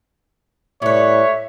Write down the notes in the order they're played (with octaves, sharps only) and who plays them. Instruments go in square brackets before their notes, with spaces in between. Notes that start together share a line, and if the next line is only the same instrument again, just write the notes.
[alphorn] A2 [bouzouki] G3 B4 [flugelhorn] C#5 [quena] E5